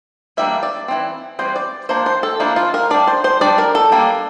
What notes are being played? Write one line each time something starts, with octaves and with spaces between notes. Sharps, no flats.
E3 G3 A#3 D4 E5
D5
E3 G3 C4
E3 G3 C4 C5
D5
F3 A#3 D4 C5
C5
A4
F3 A#3 D4 E4
F4
A#4
G3 D4 D5
C5
C5
G3 D4 D5
A#4
A4
G3 A#3 D4